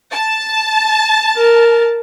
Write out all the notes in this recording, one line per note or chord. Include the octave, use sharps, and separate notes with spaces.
A5
A#4